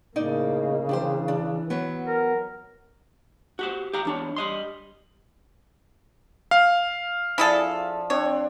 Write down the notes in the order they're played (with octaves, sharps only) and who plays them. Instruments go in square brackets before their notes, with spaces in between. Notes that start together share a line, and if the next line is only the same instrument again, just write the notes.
[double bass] A2 A#3 [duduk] C#3 [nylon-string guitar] D#4 D5
[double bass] E3 [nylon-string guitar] D4 G4 C5
[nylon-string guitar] D4
F#3 B3
[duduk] A#4
[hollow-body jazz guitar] F#4 G4 C5
G4 F5 A#5
E2 D4 C#5
G3 D#5 C6
[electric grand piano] F5
[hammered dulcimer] F3 D4 [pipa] E4 G#4 A4
[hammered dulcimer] C4 D4 [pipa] C#5